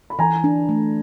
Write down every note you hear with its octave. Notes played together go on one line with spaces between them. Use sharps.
B5
E3 G#5 A#5
D4
A3